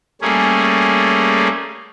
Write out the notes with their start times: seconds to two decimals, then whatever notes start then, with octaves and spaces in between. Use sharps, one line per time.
0.22 G3 A3 A#3 C#4 G#4